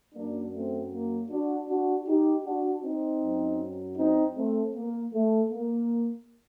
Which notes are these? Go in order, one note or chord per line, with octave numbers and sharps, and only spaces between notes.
F#2 F#3 A#3 D4
A3 C4
A#3
D4 F#4
D4 F#4
D#4 G4
D4 F#4
C4 D#4
F#2 F#3
C4 D#4
A3 C4
A#3
A3
A#3